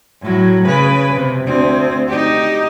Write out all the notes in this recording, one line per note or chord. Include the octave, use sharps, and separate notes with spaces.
A2 F#3
C#3 B4
C3
D2 C4
D#4 G4